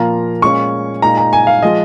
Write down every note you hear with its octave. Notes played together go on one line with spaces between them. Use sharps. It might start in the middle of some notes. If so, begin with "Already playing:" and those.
Already playing: A#2 F3 A#3 F4 A#5
A#2 G#3 C#4 C#6
A#2 G#3 D#4 A#5
A#5
G#5
F5
F3 G#3 F4 D#5